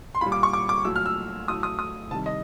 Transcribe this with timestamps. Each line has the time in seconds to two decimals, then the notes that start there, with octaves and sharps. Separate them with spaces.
0.15 C6
0.21 A#2 G3 B5
0.32 D6
0.43 C#6
0.53 D6
0.69 D6
0.85 A#2 F#3 A3 E6
0.96 F6
1.06 E6
1.48 A2 F#3 A3 D#6
1.63 D#6
1.79 D#6
2.11 C3 D#3 G3 A5
2.26 D#5